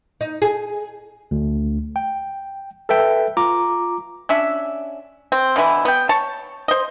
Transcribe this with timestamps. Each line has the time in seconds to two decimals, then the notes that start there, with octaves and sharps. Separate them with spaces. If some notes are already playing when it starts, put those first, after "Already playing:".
0.21 D#4
0.42 G#4
1.31 D2
1.96 G5
2.89 A4 B4 E5 G5
3.37 F4 A#5 D6
4.29 C#4 D4 E5
5.32 C4
5.56 B2 D3 E3 E4
5.85 B3 G5
6.09 C#5 A5 C#6
6.68 C5 D#5